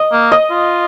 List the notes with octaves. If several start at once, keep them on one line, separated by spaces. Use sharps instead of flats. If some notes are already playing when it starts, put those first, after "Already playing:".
Already playing: D#5
A#3
D#5
F4